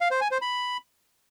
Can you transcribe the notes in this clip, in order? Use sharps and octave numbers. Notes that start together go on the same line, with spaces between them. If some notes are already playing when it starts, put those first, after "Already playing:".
F5
C5
G#5
C5
B5